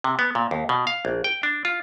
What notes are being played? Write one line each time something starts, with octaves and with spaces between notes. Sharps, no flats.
C3
B3
A#2
D#2
B2
F5
A#1
G5
D4
F4